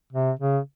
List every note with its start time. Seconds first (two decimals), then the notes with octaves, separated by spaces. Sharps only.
0.13 C3
0.39 C#3